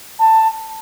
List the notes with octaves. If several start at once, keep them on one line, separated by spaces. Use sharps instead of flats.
A5